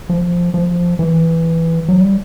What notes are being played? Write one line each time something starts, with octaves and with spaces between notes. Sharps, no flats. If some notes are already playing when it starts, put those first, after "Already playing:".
F3
F3
E3
F#3
G3